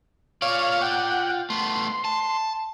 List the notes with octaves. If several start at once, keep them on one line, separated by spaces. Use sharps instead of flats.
F4 C#5 D5 F5
F#5 G5
A3 B3 C6
A5